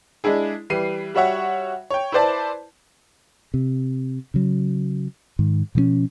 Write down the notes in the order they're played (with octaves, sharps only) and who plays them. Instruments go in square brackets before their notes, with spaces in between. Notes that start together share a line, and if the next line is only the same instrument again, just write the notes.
[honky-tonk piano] G#3 D4 E4 G#4
E3 G3 C7 D#7
G3 F#4 C#5 E5 F#5
C#5 G5
E4 B4 C5 D5 A5
[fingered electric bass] C3
C#3 F#3
G#2 D#3
B2 F3 B3 C#4